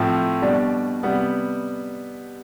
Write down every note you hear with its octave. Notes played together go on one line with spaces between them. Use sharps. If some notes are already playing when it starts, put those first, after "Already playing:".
Already playing: A2 F3 C4 F4
B2 G3 D4
C3 G3 B3